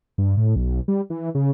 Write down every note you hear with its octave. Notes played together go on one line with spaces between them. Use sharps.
G2
A2
B1
G3
E3
C#3